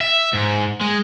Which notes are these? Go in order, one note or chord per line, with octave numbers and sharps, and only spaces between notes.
E5
G#2
G#3